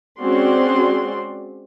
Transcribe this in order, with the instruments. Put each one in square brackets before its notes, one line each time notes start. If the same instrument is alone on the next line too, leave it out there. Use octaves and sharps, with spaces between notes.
[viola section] G#3 C4 C#4 F#4 D5 C6